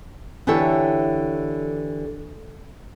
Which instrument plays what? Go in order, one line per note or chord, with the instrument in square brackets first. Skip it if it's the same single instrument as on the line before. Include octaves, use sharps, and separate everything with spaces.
[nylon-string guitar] D3 E3 G4 A4 C#5 E5